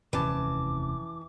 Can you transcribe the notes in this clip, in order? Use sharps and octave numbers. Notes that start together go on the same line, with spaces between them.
F1 D#2 E3 C#4 A5 D6